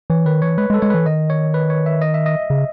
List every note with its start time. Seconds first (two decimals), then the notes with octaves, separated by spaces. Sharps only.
0.10 E3 C#5
0.25 D#3 B4
0.42 E3 C#5
0.58 G#3 B4
0.70 G#3
0.74 A4
0.82 G#3 C#5
0.90 E3 B4
1.06 D#3 D#5
1.30 C#5
1.54 B4
1.70 C#5
1.86 E5
2.02 D#5
2.14 E5
2.26 D#5
2.50 C#3